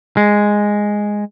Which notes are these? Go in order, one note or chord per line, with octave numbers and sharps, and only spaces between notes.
G#3